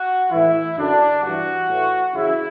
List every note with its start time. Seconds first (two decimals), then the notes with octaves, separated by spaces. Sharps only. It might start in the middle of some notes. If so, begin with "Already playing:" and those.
Already playing: F#4
0.31 A2 E3 E4
0.77 F#2 D3 D4
1.23 G2 E3 F#4
1.69 A2 E3
2.14 F#2 C#3 E3 E4